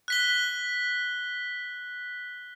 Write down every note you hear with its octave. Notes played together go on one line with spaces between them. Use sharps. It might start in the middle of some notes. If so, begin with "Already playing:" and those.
F#6 B6 G7